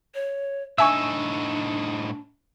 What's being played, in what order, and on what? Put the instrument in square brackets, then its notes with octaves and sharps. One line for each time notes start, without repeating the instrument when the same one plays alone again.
[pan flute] C#5
[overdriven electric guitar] A2 D#4 [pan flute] D4 [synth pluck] E5 G#5 C#6 [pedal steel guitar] E6